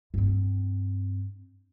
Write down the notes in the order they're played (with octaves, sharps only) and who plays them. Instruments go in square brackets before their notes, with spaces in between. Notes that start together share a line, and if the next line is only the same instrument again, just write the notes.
[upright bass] G2 C4